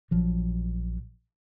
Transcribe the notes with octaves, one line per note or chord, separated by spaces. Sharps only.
A#1 F3 F#3